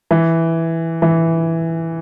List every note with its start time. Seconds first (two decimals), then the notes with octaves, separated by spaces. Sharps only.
0.11 E3
1.02 E3